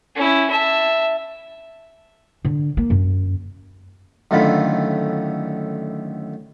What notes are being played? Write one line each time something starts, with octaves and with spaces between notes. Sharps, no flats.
C#4 E4
E5 A5
D3
A#3
F#2
F#2 A2 D3 D#3 F4 B5